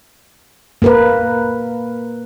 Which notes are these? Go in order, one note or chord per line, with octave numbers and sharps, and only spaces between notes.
A#3 A#4 B4